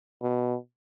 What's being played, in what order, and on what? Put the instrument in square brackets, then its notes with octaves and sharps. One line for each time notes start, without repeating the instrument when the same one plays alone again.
[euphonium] B2